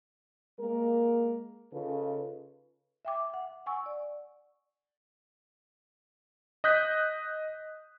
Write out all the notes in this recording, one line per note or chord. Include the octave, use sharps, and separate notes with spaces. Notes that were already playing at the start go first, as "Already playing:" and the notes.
G#3 A#3 A#4
C#3 D#4 F4 A4 B4
E5 G5 D6
F#5
F#5 G#5 C#6 E6
D5
D#5 D#6 F#6 G6 B6